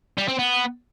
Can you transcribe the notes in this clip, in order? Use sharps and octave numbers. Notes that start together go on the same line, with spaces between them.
G3
C4
B3